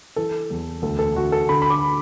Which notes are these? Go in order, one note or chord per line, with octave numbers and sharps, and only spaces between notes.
E3 A4
E2
D2 A4
A4
D3 F#4
A4
D3 B5
B5
D6